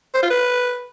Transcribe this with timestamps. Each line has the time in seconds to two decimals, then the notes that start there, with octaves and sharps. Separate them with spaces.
0.14 C5
0.22 F4
0.30 B4